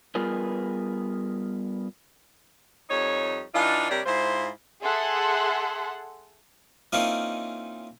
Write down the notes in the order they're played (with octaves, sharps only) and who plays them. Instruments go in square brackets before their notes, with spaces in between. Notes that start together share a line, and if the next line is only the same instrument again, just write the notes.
[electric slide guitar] G3 B3 F4 G#4 A#4 B4
[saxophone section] F2 G3 D#4 C#5
E3 D4 D#4 F4
C3 G3 D4 A#4 C#5 D5
G#2 E4 F4 C5
[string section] G#4 A4 E5 F#5 C6
[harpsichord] E3 A#3 C4 C#4 D#4 F4